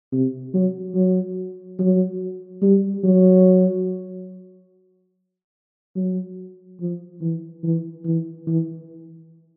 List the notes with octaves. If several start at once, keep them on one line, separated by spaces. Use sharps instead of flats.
C3
F#3
F#3
F#3
G3
F#3
F#3
F3
E3
E3
E3
E3